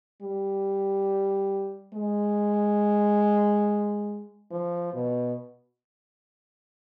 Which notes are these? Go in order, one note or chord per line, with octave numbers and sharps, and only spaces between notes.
G3
G#3
F3
B2